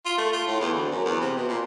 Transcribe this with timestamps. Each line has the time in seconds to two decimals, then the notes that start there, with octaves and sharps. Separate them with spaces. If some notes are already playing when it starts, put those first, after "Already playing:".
0.06 F4
0.18 A3
0.32 F4
0.47 A2
0.60 E2
0.73 D2
0.91 F#2
1.05 E2
1.20 C3
1.36 B2
1.48 A#2